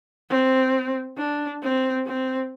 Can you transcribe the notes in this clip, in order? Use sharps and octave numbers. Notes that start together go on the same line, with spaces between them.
C4
D4
C4
C4